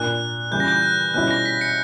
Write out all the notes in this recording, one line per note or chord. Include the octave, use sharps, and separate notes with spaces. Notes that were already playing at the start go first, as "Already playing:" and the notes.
Already playing: A#2 A#3 D4 F#6
C#3 E3 G3 G6
A#6
G6
F#6
B2 G3 C#4 E4 F#6
A#6
B6
C#7